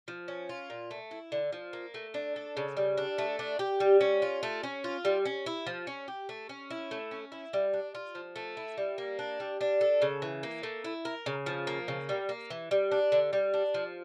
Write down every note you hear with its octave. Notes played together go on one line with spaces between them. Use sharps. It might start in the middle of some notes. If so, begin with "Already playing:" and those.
F3
C#4
F4
A#2
A3
E4
D3
F3
A#3
A3
D4
A4
C#3
G3
D4
A3
D4
G4
G3
C#4
F4
A3
C#4
F4
G3
C#4
E4
F3
C#4
G4
A3
C#4
E4
A3
C#4
E4
G3
D4
F4
F3
A3
E4
G3
A#3
D4
G3
D4
A4
C#3
E3
A#3
A3
E4
A#4
C#3
F3
A#3
C#3
G3
A#3
E3
G3
D4
D3
G3
D4
F3